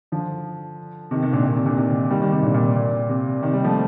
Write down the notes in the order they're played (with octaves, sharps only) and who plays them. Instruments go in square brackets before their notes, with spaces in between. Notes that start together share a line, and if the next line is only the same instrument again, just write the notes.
[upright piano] D3 F3
C3 D#3
C3 D#3
A#2 D3
A#2
C3
A#2 D3
C3 D#3
D#3 G3
D#3 G3
C3 D#3
A#2 D3
A#2
C3
A#2
C3
C3 D#3
D#3 G3
F3 A3